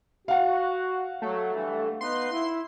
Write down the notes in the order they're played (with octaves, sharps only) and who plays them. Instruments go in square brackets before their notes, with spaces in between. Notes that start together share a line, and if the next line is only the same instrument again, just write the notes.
[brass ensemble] F#4 [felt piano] F5 F#5
[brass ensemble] F#3 [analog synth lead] A3
[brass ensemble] G2 E3
[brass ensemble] B3 D#4 B4 [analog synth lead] C6
[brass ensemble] E4